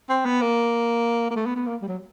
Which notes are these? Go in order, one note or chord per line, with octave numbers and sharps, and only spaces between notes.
C4
B3
A#3
A#3
A3
B3
B3
A#3
G3
F#3